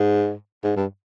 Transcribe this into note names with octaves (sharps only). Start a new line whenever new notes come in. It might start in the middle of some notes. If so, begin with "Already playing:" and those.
Already playing: G#2
G#2
G2